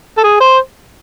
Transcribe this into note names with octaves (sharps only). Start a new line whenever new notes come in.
A4
G#4
C5